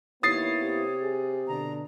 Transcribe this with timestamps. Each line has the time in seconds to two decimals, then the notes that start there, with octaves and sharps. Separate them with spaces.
0.23 D#2 A#3 B3 E4 C#5 D#6 A6 C7
0.61 C3
1.03 G#4
1.47 B2 D3 A#5